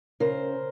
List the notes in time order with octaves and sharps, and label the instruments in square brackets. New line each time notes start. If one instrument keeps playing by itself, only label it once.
[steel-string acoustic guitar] C#3 A#4 C5